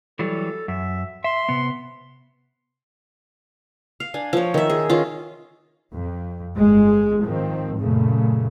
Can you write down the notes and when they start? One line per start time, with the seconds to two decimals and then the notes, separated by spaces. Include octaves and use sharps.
0.19 E3 F#3 G3 A4
0.68 F#2 E5
1.24 E5 C6
1.49 C3 B3
4.00 F5
4.14 D4 G#5
4.33 F3 C#5
4.54 D#3 E5
4.70 G#4
4.90 D#3 C#4 F4
5.92 F2
6.55 G1 G#3
7.24 G#1 D#3 F3 C4
7.80 F#2 A#2 C#3 A3